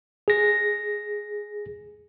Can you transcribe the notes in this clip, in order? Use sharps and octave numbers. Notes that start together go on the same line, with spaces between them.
G#4 A#6